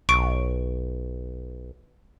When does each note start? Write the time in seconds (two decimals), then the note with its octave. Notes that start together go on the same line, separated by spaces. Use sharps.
0.09 B1 C#6 D7